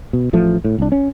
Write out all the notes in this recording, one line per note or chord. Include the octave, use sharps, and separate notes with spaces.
B2
A1 F3 A3
A2
C2 D4
C#4